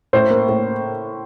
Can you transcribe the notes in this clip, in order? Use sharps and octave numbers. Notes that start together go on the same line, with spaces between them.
A2 C5
A#3
A2